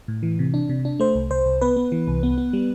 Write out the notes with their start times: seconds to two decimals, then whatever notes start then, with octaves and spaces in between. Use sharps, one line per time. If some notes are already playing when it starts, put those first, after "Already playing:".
0.08 A2
0.23 E3
0.39 C3
0.54 D4
0.69 C3
0.85 D4
1.00 A3 C5
1.15 C2
1.31 C2 C5
1.46 C2
1.61 B3 B4
1.76 B3
1.92 E3
2.08 C2
2.23 B3
2.38 B3
2.53 G3